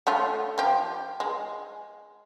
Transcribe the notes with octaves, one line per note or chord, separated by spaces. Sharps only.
A3 C#4 F4
F3 G4
G#3